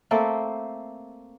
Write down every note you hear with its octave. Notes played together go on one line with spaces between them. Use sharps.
A3 A#3 C4 A4